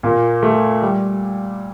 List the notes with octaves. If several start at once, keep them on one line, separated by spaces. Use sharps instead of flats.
A#2 A#3
A3
G3